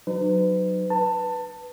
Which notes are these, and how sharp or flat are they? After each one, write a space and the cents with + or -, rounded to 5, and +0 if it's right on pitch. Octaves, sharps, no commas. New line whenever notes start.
F#3 +0 D#4 -40 B4 +40
B4 +0 A5 +20